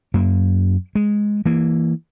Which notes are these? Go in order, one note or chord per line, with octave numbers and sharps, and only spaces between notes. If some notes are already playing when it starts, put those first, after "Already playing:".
F#2 A#3
G#3
E3 A#3